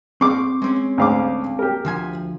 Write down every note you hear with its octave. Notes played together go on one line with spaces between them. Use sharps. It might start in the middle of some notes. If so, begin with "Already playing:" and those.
C4 F5 C#6 D6
G#3 C4 C#4
D2 F5 D6
G4 A#4
D2 F3 G#5